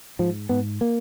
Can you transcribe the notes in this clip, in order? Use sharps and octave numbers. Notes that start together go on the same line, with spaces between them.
G#2 F3
G#2 B3
A#3